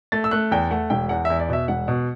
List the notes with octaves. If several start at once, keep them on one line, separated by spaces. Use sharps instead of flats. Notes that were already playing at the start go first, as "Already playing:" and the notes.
A3 A6
E6
A3 F#6
E2 G5
A3 F#5
E1 G5
E2 F#5
E2 E5
D5
B2 E5
E1 F#5
B2